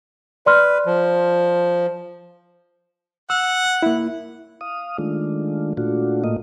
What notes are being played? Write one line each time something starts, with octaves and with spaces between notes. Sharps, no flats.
B4 D5 C6 F6
F3
F#5 E6
A#3 E4
F5 D#6
D#3 G#3 A3 D4 F4
A#2 A3 D4 F4 F#4
A2 A3 A#3 F4 D#5